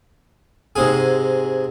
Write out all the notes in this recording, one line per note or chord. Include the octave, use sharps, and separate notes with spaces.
G#2 C3 G#4